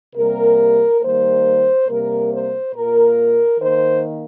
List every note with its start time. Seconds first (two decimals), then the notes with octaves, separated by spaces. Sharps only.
0.15 C3 G3 A#3 A#4
1.01 D#3 G3 A#3 C5
1.87 C3 G3 A#3 A#4
2.31 C5
2.74 A#2 A#3 A#4
3.59 D#3 A#3 C5